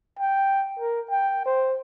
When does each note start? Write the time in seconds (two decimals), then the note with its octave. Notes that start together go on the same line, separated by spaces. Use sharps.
0.19 G5
0.79 A#4
1.10 G5
1.46 C5